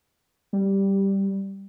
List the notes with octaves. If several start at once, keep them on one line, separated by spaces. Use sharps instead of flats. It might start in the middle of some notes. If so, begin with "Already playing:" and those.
G3